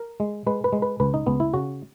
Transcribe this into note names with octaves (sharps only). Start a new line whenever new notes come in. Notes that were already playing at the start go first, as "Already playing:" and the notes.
Already playing: A#4
G#3
G#3 B4
B4
G#3
B4
C#2 B4
D#4
C#2 B3
E4
C#3 F#4